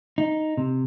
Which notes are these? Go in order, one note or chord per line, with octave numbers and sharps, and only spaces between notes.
D#4
C3